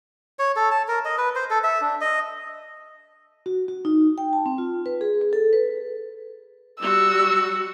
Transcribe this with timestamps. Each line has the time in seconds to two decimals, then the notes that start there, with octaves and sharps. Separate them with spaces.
0.39 C#5
0.56 A4
0.71 A5
0.88 A#4
1.05 D#5
1.18 B4
1.35 C5
1.50 A4
1.64 E5
1.81 D4
2.01 D#5
3.46 F#4
3.68 F#4
3.85 D#4
4.18 G5
4.33 A5
4.46 C4
4.58 F4
4.86 B4
5.01 G#4
5.21 G#4
5.33 A4
5.53 B4
6.81 G3 F#4 E6